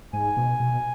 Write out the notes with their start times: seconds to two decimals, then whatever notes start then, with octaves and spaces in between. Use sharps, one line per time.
0.13 G#2 G#5
0.37 B2
0.60 B2